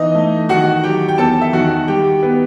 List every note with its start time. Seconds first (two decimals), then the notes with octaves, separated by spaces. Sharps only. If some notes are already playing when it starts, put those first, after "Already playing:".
Already playing: E3 B3 D#4 D#5
0.15 A3
0.49 D#3 F#4 F#5
0.84 F#3 G4 G5
1.09 G5
1.18 E2 A4 A5
1.41 E5
1.53 D#3 F#4 F#5
1.88 G3 G4 G5
2.23 B3